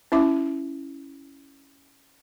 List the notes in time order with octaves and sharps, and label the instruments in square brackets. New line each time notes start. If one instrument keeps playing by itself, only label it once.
[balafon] C#4 E4 E5 D6